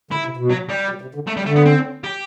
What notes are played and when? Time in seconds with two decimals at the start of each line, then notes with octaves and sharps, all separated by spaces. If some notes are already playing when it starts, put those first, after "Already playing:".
0.11 D3 E4
0.25 C3
0.37 B2
0.50 F#3
0.69 G3
0.89 B2
1.02 C3
1.15 D3
1.27 A3
1.37 G3
1.46 D3 A3
1.56 B3
1.65 C4
2.04 G4